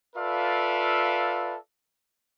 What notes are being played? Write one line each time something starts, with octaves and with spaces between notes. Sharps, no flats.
F4 A4 B4 D5 E5 F5